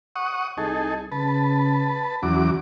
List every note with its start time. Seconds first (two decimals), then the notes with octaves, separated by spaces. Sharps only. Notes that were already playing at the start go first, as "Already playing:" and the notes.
0.16 F#5 C#6 D#6
0.58 C2 D#4 G#4 A4
1.12 C#3 B4 A5
2.23 E2 F#3 C#4 D6